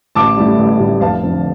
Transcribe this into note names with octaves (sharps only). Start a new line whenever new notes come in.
A1 A5 D6
A2 G3
A1
A2 G3
F1 F5 A5
F2 D3